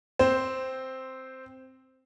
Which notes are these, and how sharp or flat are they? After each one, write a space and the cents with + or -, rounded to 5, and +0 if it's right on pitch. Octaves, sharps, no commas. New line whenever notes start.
C4 +0 C5 -5